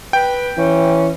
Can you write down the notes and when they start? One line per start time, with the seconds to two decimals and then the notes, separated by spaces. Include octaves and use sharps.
0.13 B4 G5
0.58 E3 C#4